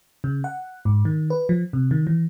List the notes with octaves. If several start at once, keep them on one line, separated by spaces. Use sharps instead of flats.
C#3
F#5
G#2
D#3
B4
F3
C3
D#3
E3